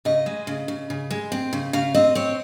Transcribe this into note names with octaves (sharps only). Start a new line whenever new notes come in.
C#3 D#5
G#3
C#3
C#3
C#3
G#3
C4
C#3
C#3 F5
C4 D#5
C4 C#5